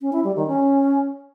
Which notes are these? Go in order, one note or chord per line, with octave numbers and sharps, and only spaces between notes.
C#4
E4
G3
D#3
C#4